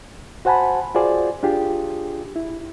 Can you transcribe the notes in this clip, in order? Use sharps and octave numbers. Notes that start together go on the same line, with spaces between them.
F#4 C5 F#5 G#5 A5 B5
F4 F#4 G#4 C5 D5 G#5
D4 F4 G4 G#4
E4